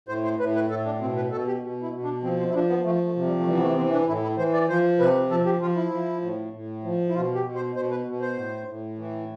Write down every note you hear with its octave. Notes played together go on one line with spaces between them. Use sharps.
A2 C5
C5
A2 B4
B4
A2 A4
D4
B2 C4
B4
B2 A4
G4
B2
E4
B2
D4
F3 C4
C4
E4
F3 D4
B3
F3 A3
A3
C3
G3
A3
E3 G3
B3
A3
B3
E3 C4
D4
A2 E4
E4
E3 C5
D5
F3 C5
C3 B4
F3 A4
G4
F3 F4
E4
F3
A2
A2
F3
E4
B2 F4
G4
B2
C5
B2 C5
B4
B2
C5
A2
A2
E3